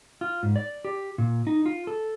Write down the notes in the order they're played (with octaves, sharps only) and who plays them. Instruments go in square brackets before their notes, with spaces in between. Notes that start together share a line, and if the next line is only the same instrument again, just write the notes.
[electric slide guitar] F4
G#2
D5
G4
A#2
D#4
F4
A4